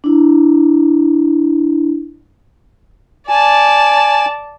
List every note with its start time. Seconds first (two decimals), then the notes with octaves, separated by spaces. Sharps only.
0.04 D4 E4
3.29 D5 G#5 A5